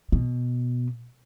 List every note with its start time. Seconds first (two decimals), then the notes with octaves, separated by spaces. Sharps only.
0.12 B2